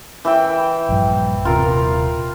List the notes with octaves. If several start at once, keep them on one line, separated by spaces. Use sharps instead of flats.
E3 E5 G5
A#1 G2
D#1 C3 F4 A#4